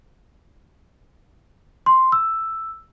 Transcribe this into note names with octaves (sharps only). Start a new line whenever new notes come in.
C6
E6